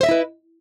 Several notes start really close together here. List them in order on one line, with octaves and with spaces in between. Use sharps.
C5 E5 D#5 E4 B4